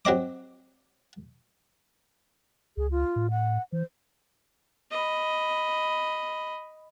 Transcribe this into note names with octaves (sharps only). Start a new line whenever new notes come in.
F#3 C4 D#5 D6
C#2 G#4
F4
A2
F#5
E3 C5
D#5 B5